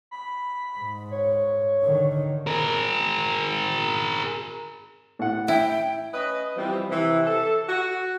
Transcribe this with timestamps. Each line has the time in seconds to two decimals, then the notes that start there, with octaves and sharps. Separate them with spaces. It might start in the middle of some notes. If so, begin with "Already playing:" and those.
0.11 B5
0.78 G#2
1.11 C#5
1.82 D3 D#3
2.47 G#4 A#4
5.19 A2 F#5
5.48 E4 G5
6.14 C#4 B4 D#5
6.56 E3 F3 G3 C4
6.91 C3 E3
7.25 A4
7.68 F#4